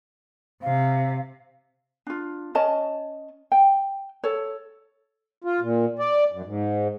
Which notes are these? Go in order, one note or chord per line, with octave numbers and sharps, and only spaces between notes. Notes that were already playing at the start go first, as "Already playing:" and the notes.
C3 F5
D4 F4
C#4 C#5 D#5 A5
G5
A4 C#5
F4
A#2
D5
F#2
G#2